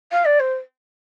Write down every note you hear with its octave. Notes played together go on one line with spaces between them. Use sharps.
F5
D5
C5